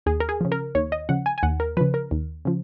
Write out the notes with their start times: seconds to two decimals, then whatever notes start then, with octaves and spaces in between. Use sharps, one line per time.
0.06 D#2 G#4
0.20 A#4
0.29 G#4
0.41 C#3 F3
0.52 A#4
0.75 D#2 C#5
0.92 D#5
1.09 C#3 F3 F#5
1.26 G#5
1.38 G#5
1.43 D#2 F#5
1.60 A#4
1.77 C#3 F3 B4
1.94 A#4
2.11 D#2
2.45 C#3 F3